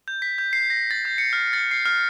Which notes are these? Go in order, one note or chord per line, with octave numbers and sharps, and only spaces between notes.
G6
B6
G6
C7
A#6
A6
G6
C#7
F6
A6
C7
F6